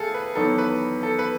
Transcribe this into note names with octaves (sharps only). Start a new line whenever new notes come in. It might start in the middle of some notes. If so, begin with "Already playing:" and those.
Already playing: D#2 A3 G#4 A4
B4
E2 D#3 F#3 B3 A4
B4
A4
B4